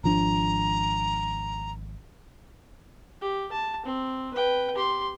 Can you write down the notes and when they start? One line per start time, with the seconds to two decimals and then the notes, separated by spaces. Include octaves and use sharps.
0.04 G#1 F3 D4 A#5
3.21 G4
3.52 A5
3.86 C4
4.34 B4 G5
4.76 G4 C6